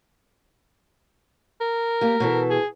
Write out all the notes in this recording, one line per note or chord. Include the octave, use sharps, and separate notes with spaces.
A#4
A#3 G4
B2 E3 A4
G#4